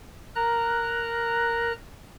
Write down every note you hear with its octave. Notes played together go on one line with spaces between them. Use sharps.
A#4 A#5 F#6